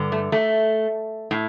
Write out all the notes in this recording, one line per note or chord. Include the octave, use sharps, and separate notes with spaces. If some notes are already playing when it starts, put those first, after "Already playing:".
Already playing: G2 D3
A3
A3
A2